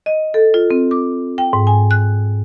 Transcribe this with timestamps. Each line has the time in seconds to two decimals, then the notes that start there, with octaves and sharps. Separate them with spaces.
0.06 D#5
0.34 A4
0.54 F4
0.71 C4
0.91 D6
1.38 G5
1.53 G#2
1.67 G#5
1.91 F#6